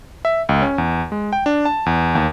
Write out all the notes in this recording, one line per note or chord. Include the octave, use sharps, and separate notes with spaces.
E5
C#2
C#4
E2
G#3
G5
D4
A5
E2
D#2